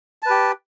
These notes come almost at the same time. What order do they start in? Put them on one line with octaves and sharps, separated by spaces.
A5 B4 G4